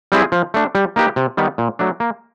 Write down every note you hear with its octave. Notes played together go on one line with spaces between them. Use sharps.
G3 C4 E4 G#4
F3
A3 D4
G3
A#3 D#4 G4 B4
C3
D#3 G3 B3
A#2
F#3 A3 D4
A#3